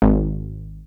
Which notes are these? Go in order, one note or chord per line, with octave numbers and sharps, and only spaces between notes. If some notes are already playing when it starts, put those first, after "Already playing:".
G#1